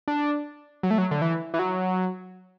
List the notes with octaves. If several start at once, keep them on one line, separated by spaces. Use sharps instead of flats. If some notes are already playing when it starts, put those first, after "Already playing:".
D4
F#3
A3
F#3
D3
E3
E3
F#3